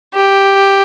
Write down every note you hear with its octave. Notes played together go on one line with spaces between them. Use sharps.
G4